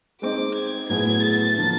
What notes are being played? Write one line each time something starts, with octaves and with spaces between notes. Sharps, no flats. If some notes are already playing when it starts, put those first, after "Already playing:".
G#3 C4 D#4 D6
G#6
A2 F#3 B3 E4 G#4 G#6
A6
D3 F3 A#3